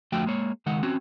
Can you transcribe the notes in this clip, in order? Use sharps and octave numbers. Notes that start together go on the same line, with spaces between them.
F2 D3 F3 A3 F#4 G5
G#3 A#3 C#5
C#2 D#3 G#3 F#5
C4 C#4 F#4